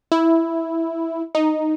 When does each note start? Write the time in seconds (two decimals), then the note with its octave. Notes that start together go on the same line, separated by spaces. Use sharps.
0.12 E4
1.35 D#4